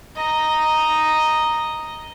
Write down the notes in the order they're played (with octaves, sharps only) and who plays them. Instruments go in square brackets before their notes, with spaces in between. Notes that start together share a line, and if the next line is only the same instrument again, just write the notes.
[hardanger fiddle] D#5 A#5